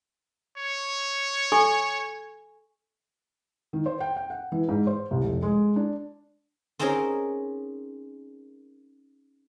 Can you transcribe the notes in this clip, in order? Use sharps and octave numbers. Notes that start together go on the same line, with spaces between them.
C#5
A4 G#5 C#6
D#3
C5
G5
G5
F#5
E3
G#2
C5
C2
F1
G#3
D4
C4 C#4 D#4 G#4 A#4